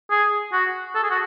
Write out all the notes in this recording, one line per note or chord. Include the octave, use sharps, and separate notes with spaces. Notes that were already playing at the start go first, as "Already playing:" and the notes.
G#4
F#4
A4
G#4
F#4